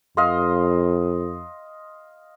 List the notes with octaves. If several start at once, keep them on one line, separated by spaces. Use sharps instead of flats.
F2 D#5 F5 C6